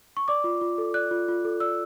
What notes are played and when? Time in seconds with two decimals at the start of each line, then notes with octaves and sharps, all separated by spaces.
0.17 C#6
0.28 D5 D6
0.44 F4
0.61 F4
0.78 A4
0.94 D5 F#6
1.11 F4
1.28 F4
1.45 A4
1.60 D5 E6